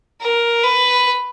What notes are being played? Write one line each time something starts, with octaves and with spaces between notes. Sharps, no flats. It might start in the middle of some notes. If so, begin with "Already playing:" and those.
A#4
B4